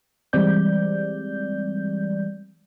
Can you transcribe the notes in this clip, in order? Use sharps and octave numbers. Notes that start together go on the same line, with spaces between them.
E3 G3 G#3 C4 D5 G6